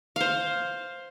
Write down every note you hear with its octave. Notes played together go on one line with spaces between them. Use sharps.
C5 F5